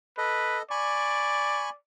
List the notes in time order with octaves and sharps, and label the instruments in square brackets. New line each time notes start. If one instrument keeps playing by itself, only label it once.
[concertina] A4 D#5 [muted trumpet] B4
[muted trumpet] D5 [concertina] G#5 B5 C#6